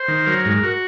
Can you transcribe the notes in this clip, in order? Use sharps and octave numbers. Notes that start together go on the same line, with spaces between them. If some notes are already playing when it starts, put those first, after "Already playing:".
Already playing: C5
D#3
F#3 A#4
G#2
F#4